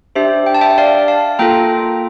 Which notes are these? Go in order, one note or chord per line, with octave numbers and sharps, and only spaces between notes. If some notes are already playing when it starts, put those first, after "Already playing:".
D4 G4 C5 E5
G5
A5
E5 G5
D5 F5
F5 A5
A#3 F4 A4 G5 A#5